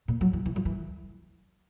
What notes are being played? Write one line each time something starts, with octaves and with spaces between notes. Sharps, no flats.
A#2
F#3
E3
E3
F#3
E3